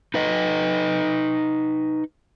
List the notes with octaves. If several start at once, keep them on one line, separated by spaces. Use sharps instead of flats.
D#4 B4 D#5